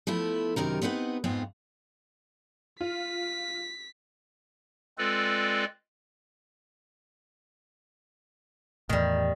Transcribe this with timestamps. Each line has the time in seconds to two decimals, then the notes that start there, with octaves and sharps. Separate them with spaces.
0.07 F3 A3 B3 E4
0.56 F#2 C3 D#3 A#4
0.82 B3 C4 D#4 B4 F#5
1.24 F2 G#2 B3 C4 F4
2.81 F4 B6
4.98 G#3 C4 F4 A4 B4 D5
8.89 E2 A2 D#3 G3